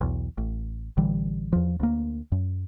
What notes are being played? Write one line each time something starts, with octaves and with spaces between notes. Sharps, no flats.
B1 E2
A1
A1 D3 E3 G3
E2 F3
D2 A#3
F#2